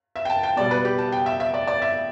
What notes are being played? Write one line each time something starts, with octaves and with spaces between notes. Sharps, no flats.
E5
G5
A5
G5
B2 G3 D5
B4
G4
A5
G5
E5
E5
D5
D5
E5